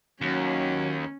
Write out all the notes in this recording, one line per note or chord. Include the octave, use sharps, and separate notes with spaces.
D#2 F#3 C#4